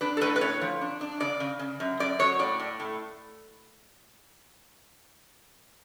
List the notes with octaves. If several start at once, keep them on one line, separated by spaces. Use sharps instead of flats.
D4 B4
A4
A2 B4
B4
A2 C#5
F3
D4
D4
C#3 D5
C#3
C#3
F#2
F#2 D5
F#3 C#5
A2 D5
A2
A2